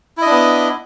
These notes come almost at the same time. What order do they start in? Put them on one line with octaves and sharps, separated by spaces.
E4 D#5 D4 B3